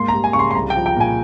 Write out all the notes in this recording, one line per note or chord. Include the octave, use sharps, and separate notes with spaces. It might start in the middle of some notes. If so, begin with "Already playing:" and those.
Already playing: G#2 A#3 C6
G3 A#5
G#5
C#3 C#6
C6
C6
C2 A#5
G5
F3
G5
A#2 G#5